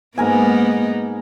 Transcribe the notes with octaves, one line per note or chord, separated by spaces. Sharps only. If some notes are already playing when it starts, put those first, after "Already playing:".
G#2 A#3 B3 D#4 A#4 G#5